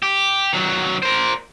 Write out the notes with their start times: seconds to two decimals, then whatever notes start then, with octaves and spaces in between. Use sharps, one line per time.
0.03 G4
0.53 D#3 F#3
1.03 A#4 C5